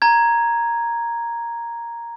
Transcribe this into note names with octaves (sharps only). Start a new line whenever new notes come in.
A#5 G#6